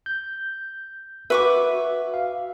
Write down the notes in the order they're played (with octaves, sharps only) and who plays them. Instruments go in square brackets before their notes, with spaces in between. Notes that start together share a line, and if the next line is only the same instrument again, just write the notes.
[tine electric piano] G6
[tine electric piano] F#4 E5 [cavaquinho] B4 C#6 D6
[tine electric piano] F5